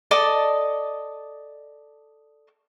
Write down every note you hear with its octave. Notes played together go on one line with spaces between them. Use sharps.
A4 D5 D#5 A5